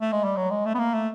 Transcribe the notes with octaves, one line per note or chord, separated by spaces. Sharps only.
A3
G#3
G3
F#3
G#3
A3
B3
A#3
A3